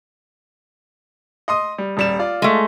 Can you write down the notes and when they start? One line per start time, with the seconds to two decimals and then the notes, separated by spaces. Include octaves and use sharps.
1.48 D#5 C6 D#6
1.78 G3
1.97 D#1 G3 E7
2.19 F4 D5
2.42 G#3 A3